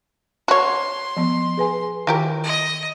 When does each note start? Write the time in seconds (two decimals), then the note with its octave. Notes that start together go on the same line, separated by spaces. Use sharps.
0.48 F#4 C#5 C6
1.17 F3 B3
1.57 G#4 B4 G#5
2.07 D#3 E3 F4 G4 A#4
2.44 D#5